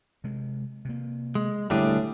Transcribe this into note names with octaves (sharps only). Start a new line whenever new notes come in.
C3 G#3
C3 A#3
G#3
D#1 A2 D3 G3 B3 D4 G#4